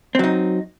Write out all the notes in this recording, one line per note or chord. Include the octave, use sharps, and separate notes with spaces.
F#3 C4 D#4